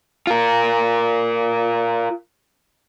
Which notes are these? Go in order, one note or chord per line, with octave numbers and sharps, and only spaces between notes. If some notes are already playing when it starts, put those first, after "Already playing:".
F4 A#4